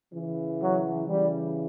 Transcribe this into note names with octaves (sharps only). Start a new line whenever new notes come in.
C#3 E3
F#3
C#3 E3 G3